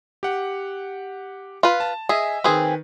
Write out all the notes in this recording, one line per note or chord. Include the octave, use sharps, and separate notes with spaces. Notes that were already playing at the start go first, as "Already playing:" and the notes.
G4 F#5
F4 B4
A5
G#4 D#5 E5
D#3 C4 G#4 B4